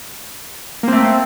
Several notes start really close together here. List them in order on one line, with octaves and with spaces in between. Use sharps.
A#3 C4 A3